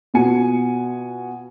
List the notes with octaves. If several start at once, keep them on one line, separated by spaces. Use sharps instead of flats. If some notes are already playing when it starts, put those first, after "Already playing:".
B2 B3 F4 F#4 G#5 C#7